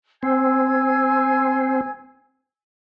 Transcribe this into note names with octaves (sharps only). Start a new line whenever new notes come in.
C4 G#5 E6 G#6